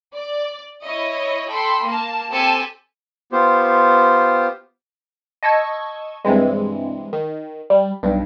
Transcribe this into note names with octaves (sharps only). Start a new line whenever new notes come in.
D5
E4 C#5 D#5
A4 G5 B5 C6
A#3 A#4 A5
C4 G4 A4 G#5 A5
B3 F4 G4 C5
D#5 A5 C#6 E6 G#6
G2 C3 E3 G#3
D#3
G3
B1 G2